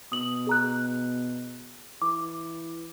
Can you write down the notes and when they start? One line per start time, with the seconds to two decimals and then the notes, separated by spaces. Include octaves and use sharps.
0.12 B2 D#6 F#7
0.47 G#4 A#5 F#6
2.02 E3 D6